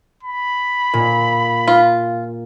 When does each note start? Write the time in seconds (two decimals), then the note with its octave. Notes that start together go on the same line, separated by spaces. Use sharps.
0.23 B5
0.93 A#2
1.68 F4